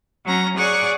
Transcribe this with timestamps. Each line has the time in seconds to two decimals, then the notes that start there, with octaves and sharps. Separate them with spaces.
0.24 F#3 C#4 A#5
0.57 G#4 C#5 D5 F#5 C#6 D6